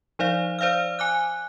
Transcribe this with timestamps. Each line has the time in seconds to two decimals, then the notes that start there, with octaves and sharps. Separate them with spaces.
0.19 F3 D#4 C5 D5 F5
0.59 C5 D5 F5 E6 F6
0.99 G#5 D6 F#6